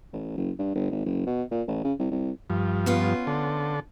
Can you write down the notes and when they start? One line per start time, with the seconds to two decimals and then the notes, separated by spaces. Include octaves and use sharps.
0.13 A1
0.37 F#1
0.59 G2
0.75 G1
0.91 G#1
1.06 F#1
1.27 B2
1.51 A#2
1.68 A1
1.84 C#3
1.99 C2
2.11 C2
2.50 G2 F3
2.86 B3 C#4 F4
3.27 D3 A4